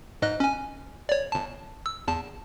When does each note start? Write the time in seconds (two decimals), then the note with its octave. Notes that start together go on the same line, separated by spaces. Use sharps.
0.22 G#2 D#5 F#6
0.40 C#4 G#5
1.09 C#5 D5
1.32 G1 A5
1.86 E6
2.08 E2 A5